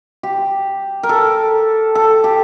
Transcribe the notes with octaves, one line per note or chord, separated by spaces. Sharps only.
G4
A#4
A4
A4
G4